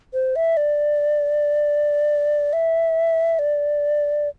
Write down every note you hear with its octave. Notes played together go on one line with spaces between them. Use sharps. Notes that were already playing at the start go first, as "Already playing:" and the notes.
C5
E5
D5
E5
D5